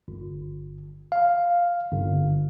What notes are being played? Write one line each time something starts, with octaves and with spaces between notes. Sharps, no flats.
G1
F5
G1